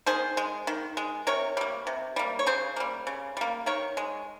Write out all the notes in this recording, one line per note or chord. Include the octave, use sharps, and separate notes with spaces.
D#3 G#4 C5
G#3
D#3
G#3
C3 A#4 C#5
G3 A#3
C3
G3 A#3
C#5
C#3 G#4 C5
G3 A#3
C#3
G3 A#3
D#3 A#4 C#5
G#3